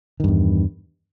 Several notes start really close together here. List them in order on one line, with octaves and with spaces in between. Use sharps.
D#3 G2 E2